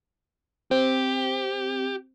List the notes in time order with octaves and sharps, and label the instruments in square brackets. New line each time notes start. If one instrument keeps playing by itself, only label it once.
[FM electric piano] C4 [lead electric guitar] G4